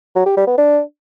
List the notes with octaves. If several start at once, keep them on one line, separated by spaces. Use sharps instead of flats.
F#3
G4
G3
B3
D4